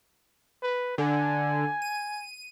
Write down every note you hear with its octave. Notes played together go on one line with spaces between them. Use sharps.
B4
D3 G#5
D#7